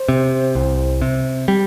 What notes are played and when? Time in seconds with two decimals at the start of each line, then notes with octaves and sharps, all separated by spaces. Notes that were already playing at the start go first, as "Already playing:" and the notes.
Already playing: C5
0.09 C3
0.55 C2
1.02 C3
1.48 G3